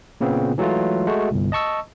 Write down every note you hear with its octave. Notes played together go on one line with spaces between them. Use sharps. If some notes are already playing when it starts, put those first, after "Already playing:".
A#2 C#3 B3 C4
E3 F#3 G#3 A3 F4
G#3 A3 F#4
G1 C2
D#5 A5 C#6 E6